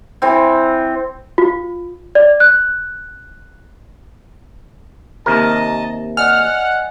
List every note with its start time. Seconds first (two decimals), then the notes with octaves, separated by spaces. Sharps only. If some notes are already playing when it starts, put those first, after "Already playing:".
0.22 E3 C4
1.38 F4
2.15 D5
2.40 F#6
5.26 D#2 C3 A#4 D#5 A5
6.17 D5 D#5 F#5 G#5 F6